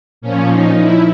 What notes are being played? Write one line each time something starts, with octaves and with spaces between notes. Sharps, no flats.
A#2 F3 C#4
D#4
E4